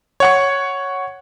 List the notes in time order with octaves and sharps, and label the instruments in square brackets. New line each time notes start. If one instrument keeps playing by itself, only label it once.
[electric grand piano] C#5 F#5 C#6